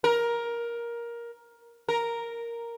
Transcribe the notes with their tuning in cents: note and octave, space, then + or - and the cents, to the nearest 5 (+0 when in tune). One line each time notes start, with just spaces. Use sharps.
A#4 +15
A#4 +0